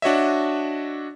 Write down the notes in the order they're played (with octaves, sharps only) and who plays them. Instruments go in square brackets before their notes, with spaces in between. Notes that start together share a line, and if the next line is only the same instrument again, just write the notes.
[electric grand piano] D4 F#4 C#5 D#5 E5